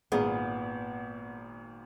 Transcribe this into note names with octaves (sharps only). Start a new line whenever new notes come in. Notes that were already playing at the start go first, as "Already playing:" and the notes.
G#1 A#2 B3 G#4 F5 A#5